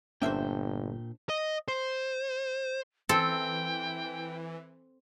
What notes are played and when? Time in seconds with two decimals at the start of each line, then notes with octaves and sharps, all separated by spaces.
0.22 G1 A#2 A#3 C#4 D4 C5 E5 G5
1.29 D#5
1.68 C5
3.09 E3 C4 A4 G5